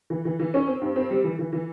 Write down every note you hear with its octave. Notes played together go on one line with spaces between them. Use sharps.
E3
E3
E3
C#4
C4
G2
C4
G3
E3
E3
E3